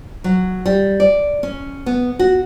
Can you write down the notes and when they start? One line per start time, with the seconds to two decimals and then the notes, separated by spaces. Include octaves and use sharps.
0.24 F#3
0.66 G3
1.00 D5
1.43 C#4
1.86 B3
2.19 F#4